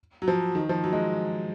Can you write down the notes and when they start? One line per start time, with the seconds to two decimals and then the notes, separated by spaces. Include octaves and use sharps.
0.22 F#3
0.28 F3
0.55 D#3
0.69 F3
0.84 F#3
0.93 G#3